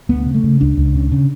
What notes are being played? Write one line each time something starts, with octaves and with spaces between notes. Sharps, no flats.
D2 B3
C#3
A3
C#3
C#2 D4
C#2
C#3
C#3